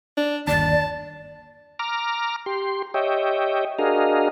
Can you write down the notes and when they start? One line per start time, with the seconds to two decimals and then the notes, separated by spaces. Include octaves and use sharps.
0.17 D4
0.47 G1 D#2 D5 A5
1.79 A#5 D6 F6
2.46 G4 C6
2.94 G4 C#5 D#5 E5 G5
3.79 D4 F#4 G#4 A#4 D#5 F5